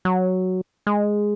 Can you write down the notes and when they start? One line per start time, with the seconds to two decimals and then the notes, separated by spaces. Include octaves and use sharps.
0.05 F#3
0.87 G#3